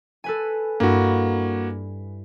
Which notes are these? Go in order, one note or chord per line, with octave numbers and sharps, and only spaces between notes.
A4 B4 G#5
G2 A#3 E4 F#4